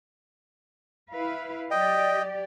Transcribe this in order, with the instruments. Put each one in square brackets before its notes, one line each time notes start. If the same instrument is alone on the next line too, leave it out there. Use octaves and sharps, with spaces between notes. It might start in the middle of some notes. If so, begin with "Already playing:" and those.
[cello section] E4 B4 F5
[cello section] F#3 G4 D5 [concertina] D#5 G5